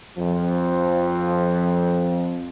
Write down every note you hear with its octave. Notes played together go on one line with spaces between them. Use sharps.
F2 F3